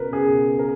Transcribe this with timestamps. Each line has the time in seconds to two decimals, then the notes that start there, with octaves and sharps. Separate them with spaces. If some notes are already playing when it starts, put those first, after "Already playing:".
Already playing: C#2 B2 A#4 B4
0.12 C#2 B2 G#4
0.59 A#4